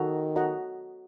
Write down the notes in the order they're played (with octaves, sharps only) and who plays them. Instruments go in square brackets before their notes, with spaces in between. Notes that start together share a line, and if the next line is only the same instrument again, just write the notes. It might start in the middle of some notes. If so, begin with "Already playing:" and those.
Already playing: [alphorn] D#3 [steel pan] F#4 A4 D#5 F#5 A#5
[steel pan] F#4 A4 D#5 F#5 A#5